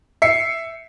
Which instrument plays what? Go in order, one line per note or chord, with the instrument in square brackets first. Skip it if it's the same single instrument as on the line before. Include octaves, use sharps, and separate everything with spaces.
[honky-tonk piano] E5 C7 C#7